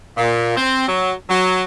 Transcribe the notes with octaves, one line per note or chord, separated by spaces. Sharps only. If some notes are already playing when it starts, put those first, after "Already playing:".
A#2
C4
F#3
F#3